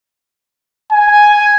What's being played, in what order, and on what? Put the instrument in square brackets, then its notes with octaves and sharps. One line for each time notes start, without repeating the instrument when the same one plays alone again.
[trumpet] G#5